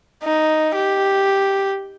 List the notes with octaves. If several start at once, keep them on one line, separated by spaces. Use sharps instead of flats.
D#4
G4